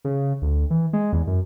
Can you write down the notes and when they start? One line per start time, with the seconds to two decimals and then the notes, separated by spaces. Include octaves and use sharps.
0.05 C#3
0.42 D2
0.70 E3
0.93 G#3
1.13 E2
1.27 F#2